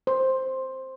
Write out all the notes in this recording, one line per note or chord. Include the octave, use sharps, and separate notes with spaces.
C5